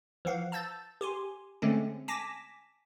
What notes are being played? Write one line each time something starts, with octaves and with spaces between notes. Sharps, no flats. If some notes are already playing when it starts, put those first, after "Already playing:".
E3 F3 F5 F#5
A5 E6 G6 A6
G4 G#5 C6
D3 G#3 A3 C4 C#4
G#5 A5 D6 A#6 B6 E7